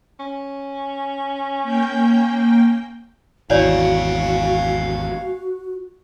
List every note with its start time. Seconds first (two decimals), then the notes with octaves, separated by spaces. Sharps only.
0.19 C#4
1.63 A#3 G5 G6
3.50 G#1 E2 E4 F#4 C#5 D5 F5 G#5